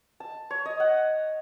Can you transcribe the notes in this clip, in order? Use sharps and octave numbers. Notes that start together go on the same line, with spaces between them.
A5
C#5
D#5
F#5